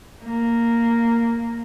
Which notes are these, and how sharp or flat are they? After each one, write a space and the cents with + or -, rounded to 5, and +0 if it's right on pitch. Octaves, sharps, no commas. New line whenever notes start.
A#3 -5